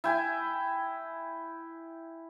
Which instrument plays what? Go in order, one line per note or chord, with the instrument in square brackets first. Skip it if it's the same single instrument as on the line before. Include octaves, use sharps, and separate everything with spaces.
[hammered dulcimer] E4 G5 G#5